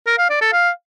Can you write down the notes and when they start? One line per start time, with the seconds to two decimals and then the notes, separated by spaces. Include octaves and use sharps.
0.07 A#4
0.18 F5
0.29 D5
0.41 A4
0.52 F5